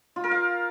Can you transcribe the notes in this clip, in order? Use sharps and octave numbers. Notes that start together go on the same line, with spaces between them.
F4
A#4
F5